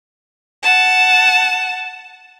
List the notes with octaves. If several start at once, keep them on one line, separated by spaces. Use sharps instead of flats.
F#5 A5